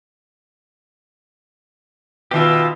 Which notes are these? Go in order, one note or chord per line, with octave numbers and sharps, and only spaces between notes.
B2 D#3 F4 G4 E5